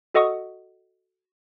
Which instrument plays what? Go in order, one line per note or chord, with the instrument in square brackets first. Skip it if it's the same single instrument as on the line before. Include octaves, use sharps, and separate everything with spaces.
[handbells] F#4 A4 D#5 F#5 C#6 D#6